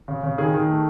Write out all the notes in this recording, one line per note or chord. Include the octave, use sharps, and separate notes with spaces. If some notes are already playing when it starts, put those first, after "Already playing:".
C#3
C#3
D#3 G#4
D#3
A3